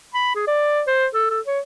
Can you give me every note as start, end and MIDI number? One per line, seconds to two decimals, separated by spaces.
0.15 0.35 83
0.36 0.46 68
0.48 0.82 74
0.87 1.07 72
1.14 1.27 69
1.31 1.40 69
1.46 1.60 73